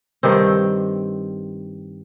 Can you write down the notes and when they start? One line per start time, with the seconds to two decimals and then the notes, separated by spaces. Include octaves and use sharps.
0.23 G2 D#3 C4